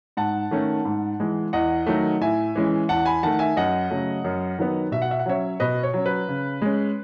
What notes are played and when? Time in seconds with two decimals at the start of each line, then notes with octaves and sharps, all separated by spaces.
0.17 G#2 F#5 A5
0.51 D#3 A3 C#4
0.85 G#2
1.20 E3 G#3
1.53 E2 D#5 F#5
1.86 D#3 F#3 A3
2.21 A2 E5 G#5
2.55 E3 G#3 C#4
2.89 E2 F#5 A5
3.06 G#5 B5
3.23 D#3 A3 F#5 A5
3.39 E5 G#5
3.57 F#2 D#5 F#5
3.90 C#3 F#3 A3
4.24 F#2
4.58 D#3 F#3 B3
4.92 B2 E5
5.02 F#5
5.11 E5
5.19 F#5
5.26 F#3 C#4 C#5 E5
5.60 B2 B4 D#5
5.83 C#5
5.94 F#3 C#4
6.06 B4
6.29 C#3
6.62 G#3 C#4